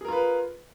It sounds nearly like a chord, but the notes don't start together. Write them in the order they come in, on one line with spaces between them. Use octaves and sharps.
G#4 A#4 F4 B4